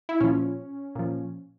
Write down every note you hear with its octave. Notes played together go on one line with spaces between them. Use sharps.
E4
A#2 F3 C#4
A#2 F3